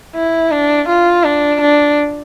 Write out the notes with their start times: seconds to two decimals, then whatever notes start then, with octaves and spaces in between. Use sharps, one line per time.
0.15 E4
0.51 D4
0.89 F4
1.24 D4
1.61 D4